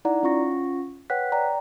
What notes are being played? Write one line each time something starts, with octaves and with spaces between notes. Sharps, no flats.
D#4 E4 D5 F#5 A#5
C#4 F4 F#5 C#6 A#6
B4 C#5 F#5 G5 F#6 B6
D5 G5 A#5